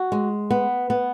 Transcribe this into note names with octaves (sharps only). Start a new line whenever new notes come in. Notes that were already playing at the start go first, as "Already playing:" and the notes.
Already playing: F#4
G#3
B3
B3